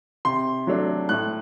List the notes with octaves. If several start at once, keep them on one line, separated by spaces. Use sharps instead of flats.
C3 C6
F#3 A3 D4
A2 F#6